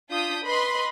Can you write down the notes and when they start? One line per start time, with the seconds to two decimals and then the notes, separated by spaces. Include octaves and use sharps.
0.11 D4 F4 D#6 G6 B6
0.45 B4 D#5 B5 C6